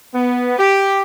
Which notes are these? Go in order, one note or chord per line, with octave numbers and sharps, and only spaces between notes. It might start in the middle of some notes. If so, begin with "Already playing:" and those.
B3
G4